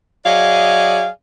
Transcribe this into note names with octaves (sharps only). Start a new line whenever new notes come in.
F#3 G#4 D5 D#5 F5